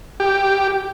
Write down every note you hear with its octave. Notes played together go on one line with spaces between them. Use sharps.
G4